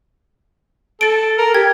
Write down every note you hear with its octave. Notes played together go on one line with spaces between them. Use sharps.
A4 A6 D7
A#4
G4 G#6